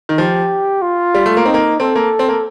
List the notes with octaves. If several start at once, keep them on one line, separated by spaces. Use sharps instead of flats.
D#3
F3 G4
F4
G3
A3
A#3
C4 D#4
A#3
C4 A4
A#3
C4
A#3